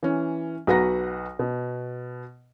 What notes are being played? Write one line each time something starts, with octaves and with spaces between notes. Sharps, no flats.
E3 C#4
B1 F#4 B4 F#5 A#5 A#6
B2